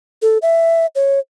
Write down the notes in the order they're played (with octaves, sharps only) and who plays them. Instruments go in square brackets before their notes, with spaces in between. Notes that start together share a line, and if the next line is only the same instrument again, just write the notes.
[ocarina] A4
E5
C#5